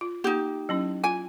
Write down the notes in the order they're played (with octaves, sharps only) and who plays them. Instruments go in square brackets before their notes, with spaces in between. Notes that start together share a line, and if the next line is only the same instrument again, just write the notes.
[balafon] F4
[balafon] A#3 [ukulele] D#4 G4
[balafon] F#3 C#4 E4
[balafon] F4 [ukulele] G#5